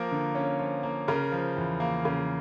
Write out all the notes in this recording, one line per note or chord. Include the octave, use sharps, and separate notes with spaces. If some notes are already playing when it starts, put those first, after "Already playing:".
Already playing: F3 A#3 A#4
D3
C#4
F3
A#3
C#3 A#4
F3
E2
A#3
C#3